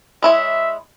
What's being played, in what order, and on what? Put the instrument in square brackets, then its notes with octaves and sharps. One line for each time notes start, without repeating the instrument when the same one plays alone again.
[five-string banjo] G#3 E4 C#5 [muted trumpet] E5